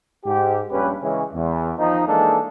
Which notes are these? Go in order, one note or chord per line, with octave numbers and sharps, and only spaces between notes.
G#2 G4
A#1 G2 C#4 G4 B4
C#3 E3 G#3 C#4
E2
D#3 F3 D#4
E3 G#3 A#3 D4 D#4 A4